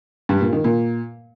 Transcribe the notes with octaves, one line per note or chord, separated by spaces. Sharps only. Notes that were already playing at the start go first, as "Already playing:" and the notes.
G2
A#2
D#3
A#2